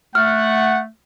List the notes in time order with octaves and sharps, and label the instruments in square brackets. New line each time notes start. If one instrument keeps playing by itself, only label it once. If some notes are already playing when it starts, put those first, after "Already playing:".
[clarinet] A3 [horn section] F#5 [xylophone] F6